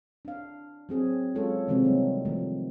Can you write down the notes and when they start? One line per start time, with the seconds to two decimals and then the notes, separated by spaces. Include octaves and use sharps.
0.25 D4 F5
0.89 F#3 C4 G#4
1.35 F#3 G#3 C#4 F4 A4 C#5
1.68 C3 D#3 E3 F#3 G#3 C4
1.84 G3 A#3
2.25 D#3 F3 A3